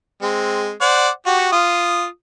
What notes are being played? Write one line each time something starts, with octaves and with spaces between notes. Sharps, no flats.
G#3 C4
C5 D5 F#5
F#4 G4
F4 D#6